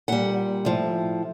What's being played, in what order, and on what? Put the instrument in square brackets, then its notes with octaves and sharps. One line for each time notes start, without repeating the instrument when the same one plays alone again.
[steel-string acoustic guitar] A#2 G3 F#5
A2 F3